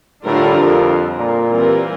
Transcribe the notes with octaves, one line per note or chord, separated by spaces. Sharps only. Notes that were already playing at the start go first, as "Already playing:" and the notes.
A2 D3 G3 D4 F4 A#4
F2
A#2
E3 G3 C4 F4 A#4